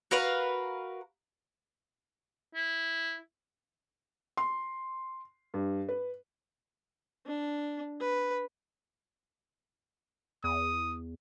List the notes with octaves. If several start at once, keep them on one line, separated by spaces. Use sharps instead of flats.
F#4 A#4 B4 F5
E4
C6
G2
B4
D4
B4
E2 D#6